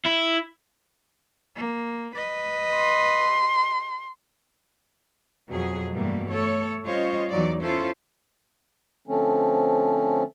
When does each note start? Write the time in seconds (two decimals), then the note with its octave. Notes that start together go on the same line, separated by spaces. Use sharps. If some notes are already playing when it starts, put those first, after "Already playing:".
0.06 E4
1.56 A#3
2.15 B4 D#5
2.75 C6
5.49 F2 B2 F#3 G#4
5.92 G2 B2 E3 G3 A3 A#3
6.30 A3 A4 C#5
6.85 G3 C#4 F4 C5 C#5 D#5
7.30 E2 E3 F#3 D#4 D5
7.62 C#4 E4 F4 A4 C5
9.08 D3 F3 A3 C4 C#4